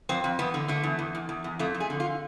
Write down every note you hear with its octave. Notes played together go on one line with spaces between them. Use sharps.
F2 C4
F2
E2 B3
D3
D3 A3
E2
E2
E2
E2
E2
F2 A3
F2
G#4
D3
F4